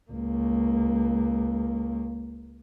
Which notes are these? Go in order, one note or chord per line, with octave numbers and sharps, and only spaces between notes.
C#2 A#3